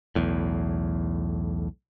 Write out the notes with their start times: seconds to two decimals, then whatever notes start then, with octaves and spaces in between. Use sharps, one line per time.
0.15 B1 E2 A2